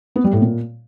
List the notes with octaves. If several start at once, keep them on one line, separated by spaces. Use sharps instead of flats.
B3
G3
A2
A#2